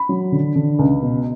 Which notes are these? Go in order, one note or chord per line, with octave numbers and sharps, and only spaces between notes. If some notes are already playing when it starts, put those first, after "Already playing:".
Already playing: B5
F#3
D3
D3
C#2
B2